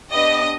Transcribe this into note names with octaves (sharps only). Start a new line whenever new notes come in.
B3 D4 G4 D#5